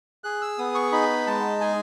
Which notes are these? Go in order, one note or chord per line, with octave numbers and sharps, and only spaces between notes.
G#4 F#6
E6
B3 D#6
C#6
D#4 B5
G#3 A5
G#4 G#5